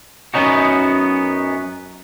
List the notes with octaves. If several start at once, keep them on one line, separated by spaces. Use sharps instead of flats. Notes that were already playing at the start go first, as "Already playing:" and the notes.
F#2 B3 C#4 D#4 F#4